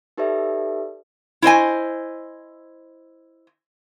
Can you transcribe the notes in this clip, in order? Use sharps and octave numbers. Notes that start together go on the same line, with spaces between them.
D#4 G4 A4 B4 D5 E5
E4 C5 D#5 G#5